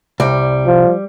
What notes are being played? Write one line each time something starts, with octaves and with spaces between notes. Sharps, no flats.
C2 G3
F3